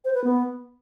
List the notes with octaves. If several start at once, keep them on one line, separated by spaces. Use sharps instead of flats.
C5
B4
B3